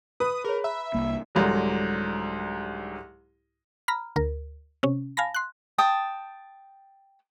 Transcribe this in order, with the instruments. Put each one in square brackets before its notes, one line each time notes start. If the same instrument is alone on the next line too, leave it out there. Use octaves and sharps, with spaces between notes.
[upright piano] B4 [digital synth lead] D#6
[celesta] G#4 C#5 [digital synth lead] A#4
[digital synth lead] E5 [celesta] A#5 B5
[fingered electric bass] C2 A#3
[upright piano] C2 G#2 D3 F#3
[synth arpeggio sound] A#5 B5 F6
D2 A#4
C3 C#4
F5 G#5 A5 B5 A#6
C6 F#6
[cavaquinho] G5 A5 D#6